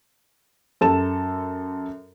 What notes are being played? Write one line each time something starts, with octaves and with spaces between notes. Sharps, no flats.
F#2 A4 A5 E7